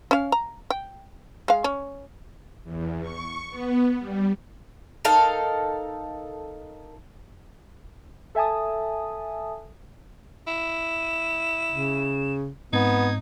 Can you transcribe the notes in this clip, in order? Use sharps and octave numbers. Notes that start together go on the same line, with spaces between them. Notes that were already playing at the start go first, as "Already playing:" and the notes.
C#4 F5
A#5
G5
G#3 F5
C#4
E2
C#6
B3
G3
D#4 A4 A#4 F5
A4 E5 G#5 A5 D#6
E4 E7
C#3
G#2 B3 C4 D#4 G#6